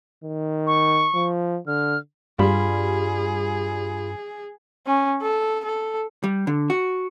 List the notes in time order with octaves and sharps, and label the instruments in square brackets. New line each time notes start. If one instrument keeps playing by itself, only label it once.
[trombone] D#3
[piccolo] C#6
[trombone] F3
[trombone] D3 [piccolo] F6
[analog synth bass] G2 [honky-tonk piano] G3 [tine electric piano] F4 B5 [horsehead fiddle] G#4
[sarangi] C#4
A4
A4
[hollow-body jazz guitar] G3
D3
F#4